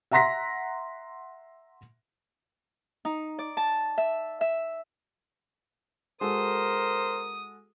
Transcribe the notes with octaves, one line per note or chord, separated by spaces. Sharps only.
E5 F#5 A#5 C6 A#6 B6
D#4
D5
A5
E5
E5
G#3 F#4 A4 A#4 C5 D#6